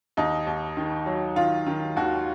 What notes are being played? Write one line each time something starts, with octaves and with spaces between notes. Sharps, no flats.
D#2 D#4
D#2
D#3
F#3
D#3 F4
D#3
D#2 F#4